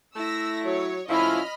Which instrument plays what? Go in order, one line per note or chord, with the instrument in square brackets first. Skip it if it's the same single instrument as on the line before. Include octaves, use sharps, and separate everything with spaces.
[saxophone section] A3 E4 [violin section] E6 A#6
[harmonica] F#3 [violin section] C#5
[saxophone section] A2 F3 E4 [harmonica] C#4 F4 [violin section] D#5 B5 F6